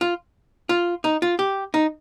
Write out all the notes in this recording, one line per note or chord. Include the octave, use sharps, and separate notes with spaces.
F4
F4
D#4
F4
G4
D#4